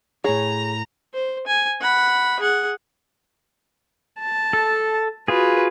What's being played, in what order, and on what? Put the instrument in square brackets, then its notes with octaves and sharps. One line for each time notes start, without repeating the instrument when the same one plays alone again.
[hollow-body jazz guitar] A2 C#5 [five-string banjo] G#4 [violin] A#5
[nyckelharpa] C5
G#5
F#5 B5
G#4 F#5
A5
[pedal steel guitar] A4
[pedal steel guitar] F4 G#4 [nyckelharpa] F#4 B4